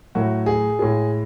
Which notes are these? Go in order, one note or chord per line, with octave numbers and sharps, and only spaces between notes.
A2 F#3 A3 F#4
G#4
A2 G#3